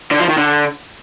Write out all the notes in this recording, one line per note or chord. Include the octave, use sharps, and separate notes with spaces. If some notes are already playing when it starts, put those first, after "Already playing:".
D3
F3
D#3
D3